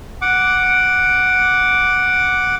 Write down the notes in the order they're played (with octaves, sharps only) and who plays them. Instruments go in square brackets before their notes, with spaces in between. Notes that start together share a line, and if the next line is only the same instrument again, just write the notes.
[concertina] F#5 D6